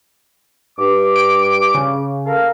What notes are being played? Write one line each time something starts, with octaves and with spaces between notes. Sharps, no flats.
G2 D6
D7
C#3
A4 A#4 F5